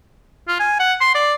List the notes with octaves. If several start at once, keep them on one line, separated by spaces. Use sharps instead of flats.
F4
G#5
F#5
C6
D5